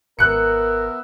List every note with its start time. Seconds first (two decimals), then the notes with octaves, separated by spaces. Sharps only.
0.19 G#1 B3 A#4 E5 F#6 C#7